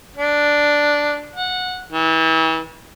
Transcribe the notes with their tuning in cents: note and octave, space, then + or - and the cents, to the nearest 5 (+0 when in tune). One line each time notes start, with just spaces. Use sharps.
D4 +0
F#5 -15
E3 -35